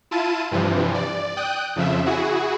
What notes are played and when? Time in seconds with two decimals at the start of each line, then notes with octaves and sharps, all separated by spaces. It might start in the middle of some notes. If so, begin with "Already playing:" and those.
0.11 E4 F4 A5 D#7
0.51 G2 C3 E3 F3
0.94 D5
1.37 G5 D#6 F#6
1.76 F2 C#3 F3 E5
2.06 E4 F#4 G#4